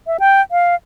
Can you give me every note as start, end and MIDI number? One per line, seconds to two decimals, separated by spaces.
0.07 0.17 76
0.20 0.42 79
0.51 0.75 77